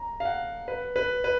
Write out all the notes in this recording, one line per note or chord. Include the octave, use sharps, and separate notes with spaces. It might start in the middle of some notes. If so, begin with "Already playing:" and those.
Already playing: A#5
F5
F#5
B4
B4
B4